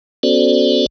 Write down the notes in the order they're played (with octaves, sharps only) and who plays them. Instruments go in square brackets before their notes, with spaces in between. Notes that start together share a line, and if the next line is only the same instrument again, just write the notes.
[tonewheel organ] B3 C#4 F#4 A4 C5 D5